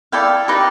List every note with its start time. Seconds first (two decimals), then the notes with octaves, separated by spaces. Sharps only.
0.12 E4 A4 D5 F5 G5
0.48 D#4 G4 B4